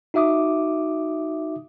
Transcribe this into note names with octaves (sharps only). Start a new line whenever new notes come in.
D#4 F#4 E5 D6 D#6